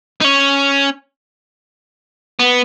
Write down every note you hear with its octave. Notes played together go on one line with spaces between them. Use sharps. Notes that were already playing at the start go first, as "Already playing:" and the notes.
D#4
C#4
B3